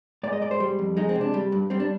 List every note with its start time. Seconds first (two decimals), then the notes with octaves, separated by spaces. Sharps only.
0.23 G#2 D5
0.33 D#5
0.42 G#2 D5
0.51 C5
0.60 G3
0.79 F2
0.97 G#3 D#4
1.09 C4
1.15 C3
1.21 D4
1.34 G3
1.52 G2
1.70 G3 C4
1.80 D4